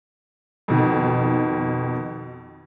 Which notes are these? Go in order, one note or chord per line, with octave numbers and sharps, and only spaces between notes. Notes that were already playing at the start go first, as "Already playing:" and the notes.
F2 B2 D#3